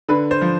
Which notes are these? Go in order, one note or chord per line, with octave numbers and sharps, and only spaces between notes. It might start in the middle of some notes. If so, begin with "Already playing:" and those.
D3 B4
C5
F3